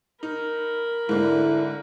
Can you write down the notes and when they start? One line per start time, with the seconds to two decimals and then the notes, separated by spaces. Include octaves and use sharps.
0.23 D#4 A#4 B5
1.09 G#2 D3 A#3 E4